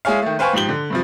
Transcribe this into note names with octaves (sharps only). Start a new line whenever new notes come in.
G#3 E4 G#4 C#5 F5
D#3 A3
B4 C5 F5 G5 G#5 C#6
G#2 F3 G4 F#7 G7
D3
G2 C3 F3